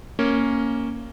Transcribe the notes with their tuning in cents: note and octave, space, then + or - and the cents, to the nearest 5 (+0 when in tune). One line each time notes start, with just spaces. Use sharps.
A#3 +0 C#4 +0